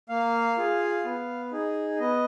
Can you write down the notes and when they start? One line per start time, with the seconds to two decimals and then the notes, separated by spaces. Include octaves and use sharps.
0.09 A#3 F5
0.57 F4 G#4
1.05 B3
1.52 D#4 G#4
2.00 B3 D#5